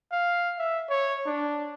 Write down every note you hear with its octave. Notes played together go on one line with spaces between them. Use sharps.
F5
E5
C#5
D4